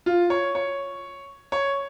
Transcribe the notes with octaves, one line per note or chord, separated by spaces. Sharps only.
F4
C#5
C#5
C#5